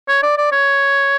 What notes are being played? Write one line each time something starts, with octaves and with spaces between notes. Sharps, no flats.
C#5
D5
D5
C#5